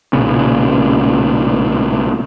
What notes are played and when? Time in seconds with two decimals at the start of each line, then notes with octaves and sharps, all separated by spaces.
0.13 B1 A#2 C#3 C#4